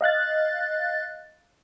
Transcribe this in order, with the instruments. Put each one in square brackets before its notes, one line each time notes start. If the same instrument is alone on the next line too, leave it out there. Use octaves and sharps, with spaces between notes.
[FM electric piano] D#5 F5 F#6 A6